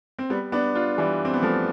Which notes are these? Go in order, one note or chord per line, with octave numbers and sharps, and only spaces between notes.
C4
G3 B3
B3 D4
D4 F4
E3 G3
C4
B3
F3 A3